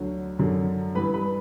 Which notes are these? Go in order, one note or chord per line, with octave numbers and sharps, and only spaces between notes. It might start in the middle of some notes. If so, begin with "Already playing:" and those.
Already playing: D2 D3 F#3
F#2 D3 F#3
G2 E3 B4 B5
B4 B5